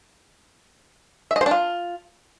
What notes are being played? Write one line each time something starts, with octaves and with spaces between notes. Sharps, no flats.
E5
D#5
C5
D4
F4